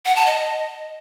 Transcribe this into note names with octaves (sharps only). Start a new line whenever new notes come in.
F#5
A5
D#5